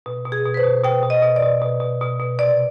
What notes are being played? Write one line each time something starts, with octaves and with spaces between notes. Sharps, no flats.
B2
B2
G#4
B2
B4
C5
B2
B2 G5
B2
D#5
B2
D5
B2
B2
B2
B2
B2
C3 D5